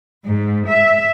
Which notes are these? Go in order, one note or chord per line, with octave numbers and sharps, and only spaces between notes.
G#2
E5